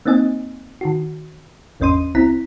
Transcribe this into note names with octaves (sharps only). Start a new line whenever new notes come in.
A#3 C4 D#4 D#5 G#5
D#3 F#4
G#1 E2 C#4 D#5 C6 D#7
C2 C4 E4 A#5 B6